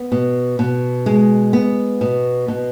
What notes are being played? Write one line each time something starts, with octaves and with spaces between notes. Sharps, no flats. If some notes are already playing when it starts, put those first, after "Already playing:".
Already playing: B3
B2
B2
G#3
B3
B2
B2